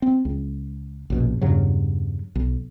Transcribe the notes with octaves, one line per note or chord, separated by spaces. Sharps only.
C4
C#2
A#1 F#2 B2
E2 G2 C#3 F#3
B1